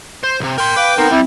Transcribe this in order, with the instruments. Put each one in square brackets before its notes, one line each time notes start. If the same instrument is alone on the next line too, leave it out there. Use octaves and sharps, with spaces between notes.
[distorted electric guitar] C5
B1 C3
[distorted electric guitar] A#4 C6 [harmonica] G5
[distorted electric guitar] B4 [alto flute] F5 [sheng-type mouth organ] D6
[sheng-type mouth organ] B3 A#4 [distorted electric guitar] C4 [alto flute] D#4
[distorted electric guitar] G3 [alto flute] C4 [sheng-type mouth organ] E4